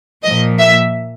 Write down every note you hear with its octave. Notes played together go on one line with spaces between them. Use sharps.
A#2 F3 D#5
E5